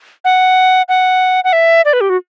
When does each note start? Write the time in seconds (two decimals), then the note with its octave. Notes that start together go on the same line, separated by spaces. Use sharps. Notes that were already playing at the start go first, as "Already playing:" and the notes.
0.25 F#5
0.89 F#5
1.44 F#5
1.53 E5
1.85 D5
1.93 B4
2.01 G4
2.10 F#4